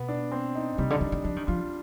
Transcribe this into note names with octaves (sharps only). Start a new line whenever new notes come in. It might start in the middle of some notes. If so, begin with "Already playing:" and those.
Already playing: B2 B3
D4
C4
D#4
C3 G3
D3
D#3 D4
D#3
F3 D4
D#3
F3 F4